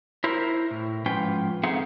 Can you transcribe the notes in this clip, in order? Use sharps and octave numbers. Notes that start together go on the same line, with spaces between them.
E4 A#4 C5
A2
G#2 F3 C#4 F4 B4 G5
A3 C4 D#4 G#4 F5 F#5